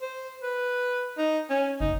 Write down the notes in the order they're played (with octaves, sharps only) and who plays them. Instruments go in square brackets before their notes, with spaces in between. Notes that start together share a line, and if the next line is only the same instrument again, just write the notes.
[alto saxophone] C5
B4
D#4
C#4
[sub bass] F#1 [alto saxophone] D#4